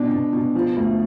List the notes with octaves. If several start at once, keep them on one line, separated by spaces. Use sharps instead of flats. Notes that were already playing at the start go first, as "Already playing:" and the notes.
Already playing: B2 D4
B2
B2
F3
D2